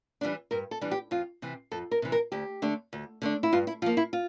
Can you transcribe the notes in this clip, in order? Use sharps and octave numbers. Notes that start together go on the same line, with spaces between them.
E3 G3 D4
G2 A#4
A4
E3 G3 D4
G4
F2 F4
C3 E3
F2 A4
A#4
C3 E3
A#4
D2 G4
D3 A3 D4
D2
D3 A3 D4
E4
G2 F4
E4
F3 A#3 F4
E4
F4